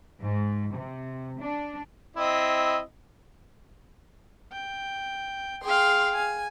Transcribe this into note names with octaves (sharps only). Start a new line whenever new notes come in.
G#2
C3
D4
C4 E4 D#5
G5
G#4 F5 G5 C6
G#5